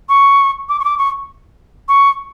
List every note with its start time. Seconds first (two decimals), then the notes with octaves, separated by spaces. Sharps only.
0.09 C#6
0.69 D6
0.80 C#6
0.84 D6
0.99 C#6
1.89 C#6